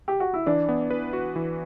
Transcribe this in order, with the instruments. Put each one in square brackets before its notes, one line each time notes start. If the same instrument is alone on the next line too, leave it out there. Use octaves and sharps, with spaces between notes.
[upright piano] G4
F#4
E4
[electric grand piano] E3 [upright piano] D4
[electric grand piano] B3
B4
F#4
E3